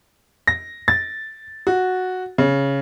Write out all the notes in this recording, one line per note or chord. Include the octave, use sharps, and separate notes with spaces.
A#6
A6
F#4
C#3